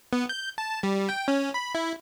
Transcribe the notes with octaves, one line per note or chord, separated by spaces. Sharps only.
B3
G6
A5
G3
G5
C#4
B5
E4